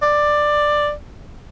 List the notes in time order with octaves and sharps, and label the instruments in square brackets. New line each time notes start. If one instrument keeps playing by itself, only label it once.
[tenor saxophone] D5